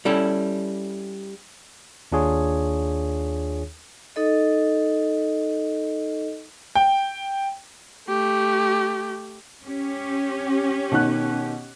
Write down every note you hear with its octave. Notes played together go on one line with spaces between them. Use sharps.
G3 C#4 E4 A4
D#2 D4 F4 G#4 C#5
D#4 A4 D#5
G5
A3 G4
C#4 G4
B2 D#3 F#6